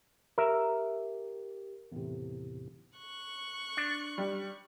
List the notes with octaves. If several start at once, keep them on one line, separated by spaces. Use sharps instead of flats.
G4 A#4 E5
E2 A2 C3
C#6 F#6
D4
G3